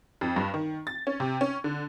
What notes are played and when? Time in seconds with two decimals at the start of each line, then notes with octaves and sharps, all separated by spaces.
0.21 F2
0.36 G2
0.54 D#3
0.87 A6
1.07 C#4
1.20 C3
1.41 C#4
1.64 D3